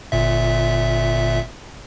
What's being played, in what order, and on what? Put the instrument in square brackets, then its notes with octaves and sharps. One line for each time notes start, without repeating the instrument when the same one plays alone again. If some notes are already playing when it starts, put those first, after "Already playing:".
[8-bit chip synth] G1 A#2 E5